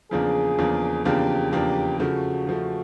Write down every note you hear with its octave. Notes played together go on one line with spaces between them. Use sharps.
E2 C#3 F3 A#3 D4 G#4
E2 C#3 F3 A#3 D4
E2 C#3 F3 A#3 D4 G4
E2 C#3 F3 A#3 D4 G4
C#3 F3 A3 F#4
C#3 F3 A3